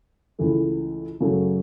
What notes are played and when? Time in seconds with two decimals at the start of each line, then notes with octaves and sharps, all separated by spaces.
0.39 C#2 C#3 E3 A3
1.21 F#2 C#3 F#3 A3